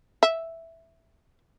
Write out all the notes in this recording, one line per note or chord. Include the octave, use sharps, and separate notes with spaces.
E5